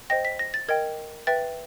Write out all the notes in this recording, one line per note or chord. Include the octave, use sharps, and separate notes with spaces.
C5 D#5 G5 A#6
B6
A#6
A6
A#4 D#5 G5 G#6
B4 E5 G5 A6